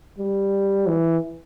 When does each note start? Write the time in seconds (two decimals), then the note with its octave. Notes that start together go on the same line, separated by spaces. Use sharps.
0.18 G3
0.87 E3